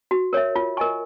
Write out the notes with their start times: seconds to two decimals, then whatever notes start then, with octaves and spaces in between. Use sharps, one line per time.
0.11 F#4
0.33 A#4 C#5 E5
0.56 F4
0.77 A#4 D#5 G#5 C#6